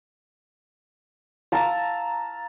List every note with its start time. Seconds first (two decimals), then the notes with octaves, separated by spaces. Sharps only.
1.52 F5 A5 A#5 E6